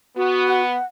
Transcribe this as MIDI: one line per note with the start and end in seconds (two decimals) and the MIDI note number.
0.16 0.76 59
0.16 0.62 66
0.48 0.86 78